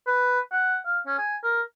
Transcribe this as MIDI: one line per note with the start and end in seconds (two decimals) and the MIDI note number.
0.07 0.40 71
0.52 0.78 78
0.86 0.99 77
1.07 1.18 61
1.18 1.37 80
1.43 1.61 70